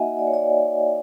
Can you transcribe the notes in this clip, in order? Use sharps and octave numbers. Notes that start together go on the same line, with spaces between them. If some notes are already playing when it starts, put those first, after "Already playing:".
Already playing: A#3 D#4 F#4 D#5 E5 F#5 G#5
D5
C#5
D5